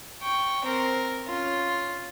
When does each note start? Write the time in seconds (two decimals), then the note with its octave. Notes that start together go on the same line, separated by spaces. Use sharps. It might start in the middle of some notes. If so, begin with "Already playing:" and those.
0.22 G5 C#6
0.65 C4 A#4
1.26 C#4 F4